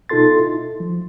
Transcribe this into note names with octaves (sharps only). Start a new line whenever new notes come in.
B2 D#4 F4 A4 C6 A6
E4
F3